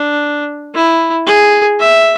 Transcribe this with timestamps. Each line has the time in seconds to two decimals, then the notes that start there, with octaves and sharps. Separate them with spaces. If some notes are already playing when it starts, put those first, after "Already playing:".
Already playing: D4
0.75 E4
1.27 G#4
1.80 E5